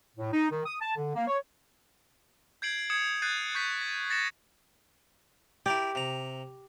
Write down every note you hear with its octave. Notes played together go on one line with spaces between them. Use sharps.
A2
D#4
D#3
D#6
A5
D3
A#3
C#5
G6 G#6 C7 D7 F#7
D#6 G#6 C#7 E7
D#6 F#6 G6 A6 C7 D#7
C#6 G6 B6
A6
A6 A#6 C#7 E7
E4 G4 A#4 D5
C3 A#5